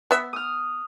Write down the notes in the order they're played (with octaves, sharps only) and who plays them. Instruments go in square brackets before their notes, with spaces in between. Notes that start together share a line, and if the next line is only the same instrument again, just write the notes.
[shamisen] B3 E5
[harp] D#6 F6